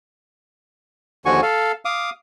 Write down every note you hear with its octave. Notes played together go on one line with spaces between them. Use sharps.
D#2 D3 F3 F#4 G#5 C#6
A4 F5
F5 D6 D#6